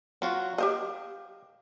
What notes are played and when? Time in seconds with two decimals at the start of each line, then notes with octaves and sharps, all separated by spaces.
0.22 F#3 C4 F4 F#4
0.58 G4 C5 D#5 F5 G5